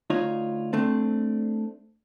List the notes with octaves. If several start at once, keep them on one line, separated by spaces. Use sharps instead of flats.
D2 D#4 F4 C#5
A3 C4 D4